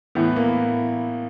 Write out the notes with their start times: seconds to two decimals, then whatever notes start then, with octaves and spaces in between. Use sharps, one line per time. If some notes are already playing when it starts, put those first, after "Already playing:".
0.15 A2 E3 B3
0.36 A#3